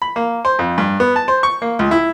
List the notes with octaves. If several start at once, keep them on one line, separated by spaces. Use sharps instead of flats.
B5
A#3
C5
F2
G2
B3
A5
C5
C#6
A#3
C#2
E4